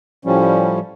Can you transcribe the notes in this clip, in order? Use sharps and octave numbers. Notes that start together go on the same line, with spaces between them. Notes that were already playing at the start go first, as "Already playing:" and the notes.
A2 F3 G3 C#4